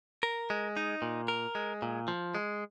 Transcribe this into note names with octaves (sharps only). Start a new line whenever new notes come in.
A#4
G#3
D#4
A#2
A#4
G#3
A#2
F3
G#3